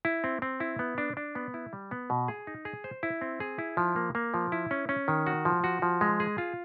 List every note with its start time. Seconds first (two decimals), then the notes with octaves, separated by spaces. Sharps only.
0.05 E4
0.24 C4
0.42 C4
0.60 E4
0.79 B3
0.98 D4
1.17 D4
1.35 B3
1.54 E4
1.73 G3
1.91 B3
2.10 B2
2.28 G#4
2.47 D#4
2.65 G#4
2.84 C5
3.03 E4
3.21 C4
3.40 G#4
3.58 E4
3.77 F3
3.96 A#3
4.15 A#3
4.34 F3
4.52 E4
4.71 C#4
4.89 C#4
5.08 D#3
5.27 F#4
5.45 F3
5.64 F#4
5.82 F3
6.01 G#3
6.20 G#4
6.38 F4